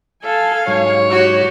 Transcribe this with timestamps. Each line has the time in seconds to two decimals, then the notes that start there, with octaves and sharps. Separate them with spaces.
0.24 A4 F5 G#5
0.67 G#2 F#3 C#5
1.11 F#4 G4